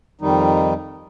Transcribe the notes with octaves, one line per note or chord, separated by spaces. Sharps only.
F2 D#3 G3 D#4